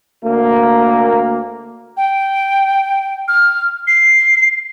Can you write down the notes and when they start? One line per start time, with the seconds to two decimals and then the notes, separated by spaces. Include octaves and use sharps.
0.24 D2 A#3
1.97 G5
3.28 F6
3.87 C7